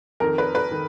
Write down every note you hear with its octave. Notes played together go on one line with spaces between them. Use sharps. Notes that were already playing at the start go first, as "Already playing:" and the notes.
F2 D#3 A#4
B4
B4
D#3